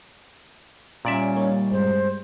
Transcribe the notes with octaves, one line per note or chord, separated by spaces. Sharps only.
A#2 G3 C#4 D5 E5
A#3 D#4 C#5
G2 G#3 C4 C5